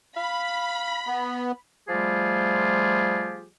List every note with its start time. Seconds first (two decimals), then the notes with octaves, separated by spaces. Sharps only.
0.17 F5 B5
1.07 B3
1.88 F3 G3 A3 F4 G4 G#4